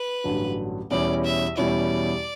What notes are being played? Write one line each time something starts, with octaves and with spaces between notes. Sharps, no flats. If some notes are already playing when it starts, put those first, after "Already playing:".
Already playing: B4
A1 G2 D3 F#3
E2 B2 G3 C#4 E4 D5
E5
E2 B2 G3 C#4 E4 D5